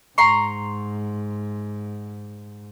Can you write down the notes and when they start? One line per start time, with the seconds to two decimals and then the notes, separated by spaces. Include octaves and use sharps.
0.18 G#2 A#5 C6 C#6